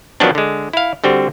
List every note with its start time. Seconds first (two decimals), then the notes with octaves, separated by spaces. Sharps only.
0.20 D#3 F3 F#3 B3 C4 D4
0.35 D3 G#3
0.73 E4 F5
1.04 D3 G3 C4 F#4